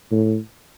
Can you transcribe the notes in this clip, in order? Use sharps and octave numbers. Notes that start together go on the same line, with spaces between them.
A2